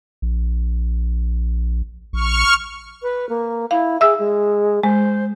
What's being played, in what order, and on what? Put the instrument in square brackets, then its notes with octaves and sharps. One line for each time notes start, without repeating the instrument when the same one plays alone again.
[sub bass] A#1
[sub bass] A#1 [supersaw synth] C#6 F6
[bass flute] B4
A#3
[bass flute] E4 [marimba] F5
[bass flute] G#4 [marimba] E5 E6
[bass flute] G#3
[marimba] G#3 [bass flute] C5